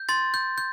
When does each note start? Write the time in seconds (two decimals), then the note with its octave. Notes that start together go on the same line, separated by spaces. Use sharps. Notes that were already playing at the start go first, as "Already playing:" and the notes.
Already playing: G6
0.09 C6 A6
0.34 G6
0.58 G6